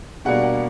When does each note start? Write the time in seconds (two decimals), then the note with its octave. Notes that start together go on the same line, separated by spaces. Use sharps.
0.25 B2 G3 A#3 D4 F#5
0.43 F#5